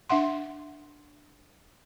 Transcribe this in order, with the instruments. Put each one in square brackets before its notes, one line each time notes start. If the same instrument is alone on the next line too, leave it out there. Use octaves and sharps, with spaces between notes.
[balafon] D4 E5 F#5 C6